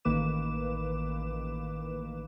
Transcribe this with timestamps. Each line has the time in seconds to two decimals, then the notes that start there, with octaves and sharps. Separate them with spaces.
0.05 A1 D#3 A#3 B4 D6 E7